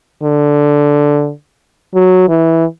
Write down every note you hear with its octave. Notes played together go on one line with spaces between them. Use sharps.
D3
F#3
E3